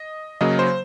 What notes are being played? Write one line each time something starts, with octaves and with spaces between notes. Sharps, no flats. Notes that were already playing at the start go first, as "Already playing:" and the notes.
Already playing: D#5
C#3 F#3 A#3 D#5
C5